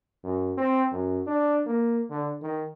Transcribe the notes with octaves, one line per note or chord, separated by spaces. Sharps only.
F#2
C4
F#2
D4
A#3
D3
D#3